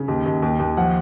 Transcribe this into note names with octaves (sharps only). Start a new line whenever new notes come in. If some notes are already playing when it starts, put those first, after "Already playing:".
Already playing: C#3
D#2
D#2
D#2
D#2
F3 F#5